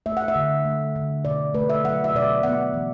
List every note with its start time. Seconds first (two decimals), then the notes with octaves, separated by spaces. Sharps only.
0.06 A3 E5
0.17 F#5
0.28 E5
0.36 D3
0.65 A3
0.96 D3
1.25 B2 D5
1.54 A3 B4
1.70 E5
1.84 F#3 F#5
2.04 E5
2.15 B2 D5
2.24 E5
2.43 B3 F#5
2.74 E3